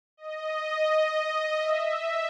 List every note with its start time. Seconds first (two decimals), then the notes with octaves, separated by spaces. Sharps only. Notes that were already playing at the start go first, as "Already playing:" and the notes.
0.17 D#5
1.55 E5